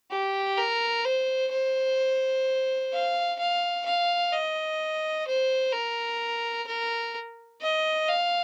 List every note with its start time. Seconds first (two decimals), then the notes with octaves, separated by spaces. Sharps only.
0.12 G4
0.58 A#4
1.05 C5
1.52 C5
2.93 F5
3.39 F5
3.86 F5
4.33 D#5
5.27 C5
5.73 A#4
6.67 A#4
7.61 D#5
8.08 F5